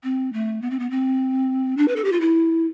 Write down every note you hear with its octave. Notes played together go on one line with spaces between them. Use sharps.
C4
A3
B3
C4
B3
C4
D4
B4
A4
G4
F4
E4